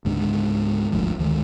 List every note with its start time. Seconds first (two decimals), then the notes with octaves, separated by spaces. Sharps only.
0.05 C#2 G#2 D3
0.92 G1 D2 F3
1.19 D2 D#3 F3 G#3